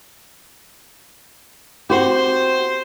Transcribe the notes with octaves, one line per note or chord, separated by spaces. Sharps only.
C4 F#4 G4 C5